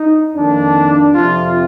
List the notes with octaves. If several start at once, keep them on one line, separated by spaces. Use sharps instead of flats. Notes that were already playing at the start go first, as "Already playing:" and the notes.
Already playing: D#4
F2 D#3 A#3 D4
F2 C3 F3 C4 F4